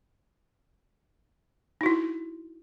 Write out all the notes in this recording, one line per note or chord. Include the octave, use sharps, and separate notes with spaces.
D#4 E4 F#4